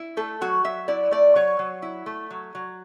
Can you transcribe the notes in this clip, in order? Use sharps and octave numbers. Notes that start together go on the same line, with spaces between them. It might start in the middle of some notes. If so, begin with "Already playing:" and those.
Already playing: E4
A3 A4
F#3 F#4
F#3 E5
E4 D5
A3 D5
F#3 C#5
F#3
E4
A3
F#3
F#3